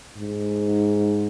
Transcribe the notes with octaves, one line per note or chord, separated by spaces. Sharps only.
G#2